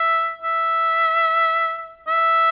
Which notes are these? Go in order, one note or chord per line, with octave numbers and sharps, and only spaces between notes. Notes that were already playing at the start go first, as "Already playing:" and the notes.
Already playing: E5
E5
E5